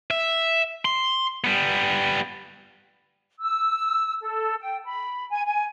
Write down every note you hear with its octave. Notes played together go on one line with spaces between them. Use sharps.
E5
C6
G3 B3
E6
A4
G5
B5
G#5
G#5